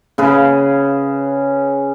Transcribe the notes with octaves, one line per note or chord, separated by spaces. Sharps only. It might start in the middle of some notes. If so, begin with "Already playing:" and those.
C#3 G#4 B4